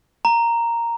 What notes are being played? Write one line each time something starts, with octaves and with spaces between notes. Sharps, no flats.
A#5